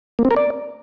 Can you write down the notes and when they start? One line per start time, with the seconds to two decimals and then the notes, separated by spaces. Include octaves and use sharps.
0.19 A#3
0.25 C4
0.31 A#4
0.37 D5